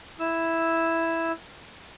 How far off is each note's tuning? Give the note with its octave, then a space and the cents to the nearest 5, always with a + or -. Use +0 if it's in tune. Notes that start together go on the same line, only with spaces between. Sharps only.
E4 +0 E6 +0